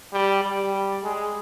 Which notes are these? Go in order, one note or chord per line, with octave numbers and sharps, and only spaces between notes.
G3
G3
G#3